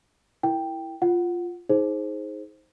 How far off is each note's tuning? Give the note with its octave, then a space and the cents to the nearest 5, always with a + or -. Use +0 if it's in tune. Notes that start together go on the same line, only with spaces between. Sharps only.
E4 +0 A#4 +0 G5 +0
F4 +0 F#5 +5
D#4 +25 G#4 +10 C5 +10